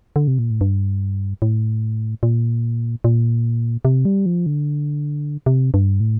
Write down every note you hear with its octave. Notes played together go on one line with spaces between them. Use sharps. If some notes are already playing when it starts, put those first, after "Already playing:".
D3
C3
A#2
A2
G2
A2
A#2
A#2
C3
G3
F3
D3
C3
G2
A2